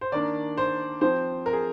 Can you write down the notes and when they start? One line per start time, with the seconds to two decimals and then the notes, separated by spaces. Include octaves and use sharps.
0.01 C5
0.12 D#3 A#3 D4 D5
0.57 C5
1.01 F3 C4 C5
1.46 A#4
1.53 G#4